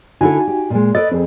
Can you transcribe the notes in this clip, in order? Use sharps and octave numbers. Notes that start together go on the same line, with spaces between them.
D3 D#4 E4 F#4 A4 G#5
G4
A#2 G#3
A4 B4 D5 D#5 A6
F2 C4 G#4